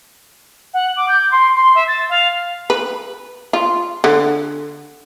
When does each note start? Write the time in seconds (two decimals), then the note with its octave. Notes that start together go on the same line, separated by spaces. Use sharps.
0.73 F#5
0.96 D6
1.08 G6
1.31 C6
1.55 C6
1.75 E5
1.87 A6
2.09 F5
2.70 B4
3.53 F4
4.04 D3